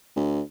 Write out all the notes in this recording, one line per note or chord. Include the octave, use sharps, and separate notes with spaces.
D2